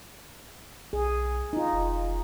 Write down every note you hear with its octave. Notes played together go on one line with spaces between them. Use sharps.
B1 G#4
D#4 F4
F1